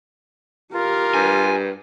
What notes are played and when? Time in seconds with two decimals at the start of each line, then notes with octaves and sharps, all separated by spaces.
0.74 F4 G4 A#4
1.14 G2 G#5